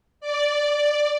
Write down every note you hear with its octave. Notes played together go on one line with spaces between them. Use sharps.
D5